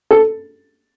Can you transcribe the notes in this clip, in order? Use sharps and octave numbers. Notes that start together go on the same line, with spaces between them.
A4